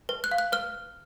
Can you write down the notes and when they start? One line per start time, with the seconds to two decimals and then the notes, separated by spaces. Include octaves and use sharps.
0.09 B4
0.24 F#6
0.31 F5
0.38 F#6
0.52 B4 F6